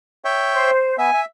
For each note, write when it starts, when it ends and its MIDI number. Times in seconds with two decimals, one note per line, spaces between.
0.25 0.71 73
0.25 0.71 76
0.25 0.71 79
0.53 0.96 72
0.98 1.10 59
0.98 1.10 76
0.98 1.21 80
1.13 1.25 76